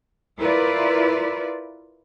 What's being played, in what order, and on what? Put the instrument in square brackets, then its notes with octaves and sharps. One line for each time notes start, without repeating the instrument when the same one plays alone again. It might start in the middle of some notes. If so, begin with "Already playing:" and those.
[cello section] E4 F4 A#4 B4 D5